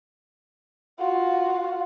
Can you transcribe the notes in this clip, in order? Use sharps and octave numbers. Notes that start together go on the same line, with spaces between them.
F4 F#4